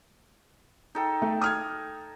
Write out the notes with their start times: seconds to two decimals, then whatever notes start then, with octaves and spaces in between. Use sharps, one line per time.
0.95 D#4 A4 G5
1.22 A3
1.41 D#6 F6 G#6